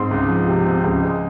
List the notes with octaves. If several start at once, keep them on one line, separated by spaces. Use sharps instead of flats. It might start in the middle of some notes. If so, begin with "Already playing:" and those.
Already playing: G#2 C4 C6
C#2
F3
C3
C4
C#2
G#3